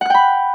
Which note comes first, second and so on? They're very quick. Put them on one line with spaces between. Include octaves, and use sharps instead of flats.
F#5 F#6 G5 B5